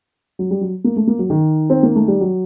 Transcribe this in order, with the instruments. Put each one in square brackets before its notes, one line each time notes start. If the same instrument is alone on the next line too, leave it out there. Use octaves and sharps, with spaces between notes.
[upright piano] F#3
G3
F#3
A#3
A3
A#3
F#3
D#3
C4
A#3
A3
G3
F#3